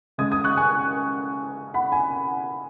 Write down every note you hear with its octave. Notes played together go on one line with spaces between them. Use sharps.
C#3 G#3 D#6 G#6
D#6 G#6
C#6 F#6
G#5 C#6
F#5 B5
G#5